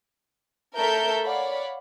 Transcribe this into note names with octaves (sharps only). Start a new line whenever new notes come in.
A3 A4 A#4 E5 G6
C#5 D5 F5 F#5 B5